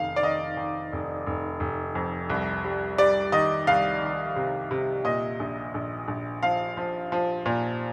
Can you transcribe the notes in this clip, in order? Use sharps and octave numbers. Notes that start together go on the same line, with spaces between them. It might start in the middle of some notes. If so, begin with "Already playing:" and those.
Already playing: F1 D#3 F5
D5
D#3 D#5
D#3
F1
F1
F1
F2
C2
G3
G3 D5
D#3 D#5
C2 F5
D#3
C3
C3
A#2 D#5
A#1
A#1
A#1
F3 F5
F3
F3
A#2